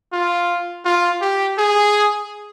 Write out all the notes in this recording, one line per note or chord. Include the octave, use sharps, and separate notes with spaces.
F4
F4
G4
G#4